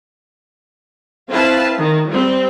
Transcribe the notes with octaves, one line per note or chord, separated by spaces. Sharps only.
C4 E4 B4 F5 A5
D#3
G3 C4